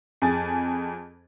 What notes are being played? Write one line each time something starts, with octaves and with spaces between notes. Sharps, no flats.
F2 G#4 G#5 A6